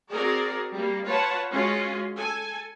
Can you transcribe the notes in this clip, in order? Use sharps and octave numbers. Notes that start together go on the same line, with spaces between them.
C4 F#4 G#4 A#4 D5
G3 A#3
F4 B4 C#5 F#5 A5
G#3 C#4 F4 F#4
A4 G#5